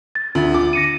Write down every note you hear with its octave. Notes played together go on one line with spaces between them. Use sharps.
A6
D2 F4
D6
A#6 C#7 D#7